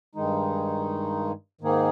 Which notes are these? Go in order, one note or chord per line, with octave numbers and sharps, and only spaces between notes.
G2 D#3 G#3 D#4
G#2 D#3 A#3 D#4 G#4